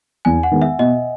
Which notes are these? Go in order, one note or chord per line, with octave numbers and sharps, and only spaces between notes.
E2 G#5
F#5
D#3 G#3 B3
E5
B2 D#5